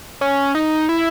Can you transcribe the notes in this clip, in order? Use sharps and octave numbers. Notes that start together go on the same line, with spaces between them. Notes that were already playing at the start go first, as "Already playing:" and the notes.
C#4
D#4
E4